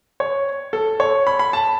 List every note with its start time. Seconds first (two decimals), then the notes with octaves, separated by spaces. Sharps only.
0.20 C#5
0.73 A4
1.00 C#5
1.27 B5
1.39 B5
1.53 A5